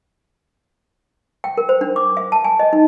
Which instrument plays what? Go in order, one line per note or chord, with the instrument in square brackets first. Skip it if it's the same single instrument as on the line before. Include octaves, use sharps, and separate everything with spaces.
[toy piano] G5
A#4
C5
D4
D6
E5
A5
G#5
D#5
D#4